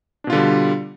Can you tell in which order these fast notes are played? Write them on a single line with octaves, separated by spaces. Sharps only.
D4 B2 F4 D3 G3